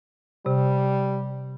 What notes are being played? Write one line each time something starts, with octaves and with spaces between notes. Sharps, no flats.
C3 G3